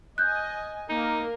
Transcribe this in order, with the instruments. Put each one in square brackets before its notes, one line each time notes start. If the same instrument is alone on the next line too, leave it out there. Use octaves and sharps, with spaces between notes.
[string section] D#5 G#5 [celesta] F#6 G6
[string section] A#3 A#4 [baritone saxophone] D#4